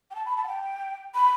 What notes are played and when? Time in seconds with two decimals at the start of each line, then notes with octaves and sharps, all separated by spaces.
0.11 G5
0.15 A5
0.26 B5
0.37 A5
0.44 F#5
0.48 G5
1.15 B5